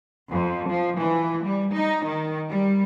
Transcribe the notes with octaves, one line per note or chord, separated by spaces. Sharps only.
F2
F3
E3
G3
D#4
D#3
G3